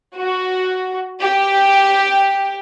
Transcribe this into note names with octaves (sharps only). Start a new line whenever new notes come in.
F#4
G4